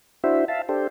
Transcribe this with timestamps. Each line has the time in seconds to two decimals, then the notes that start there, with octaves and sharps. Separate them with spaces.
0.24 D4 E4 F#4 C5 E5
0.48 E5 F5 A5
0.69 D4 G4 A4 C5